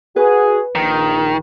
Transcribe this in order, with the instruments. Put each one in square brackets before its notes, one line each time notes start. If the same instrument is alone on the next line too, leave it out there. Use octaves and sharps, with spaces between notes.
[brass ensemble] F#4 G#4 [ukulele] B4
[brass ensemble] A#1 [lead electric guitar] D#3